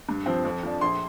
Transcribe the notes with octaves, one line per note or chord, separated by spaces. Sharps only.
G2
F3 C4
F2
F3 D4
A#1 C6